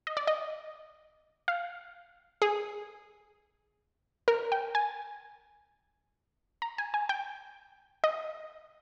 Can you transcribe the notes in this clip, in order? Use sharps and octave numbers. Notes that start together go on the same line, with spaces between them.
D#5
D5
D#5
F5
G#4
A#4
G5
G#5
A#5
G#5
G#5
G5
D#5